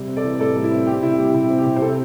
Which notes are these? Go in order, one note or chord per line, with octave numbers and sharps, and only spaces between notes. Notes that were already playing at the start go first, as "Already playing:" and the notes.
Already playing: C3 G3
C4
A4 D5
E3
A2 A4 D5
G3
E4
C4
C4 G4
C3 E4
G3 G4
C3 E4
C4
G4
C3
C5
C4 E4 A4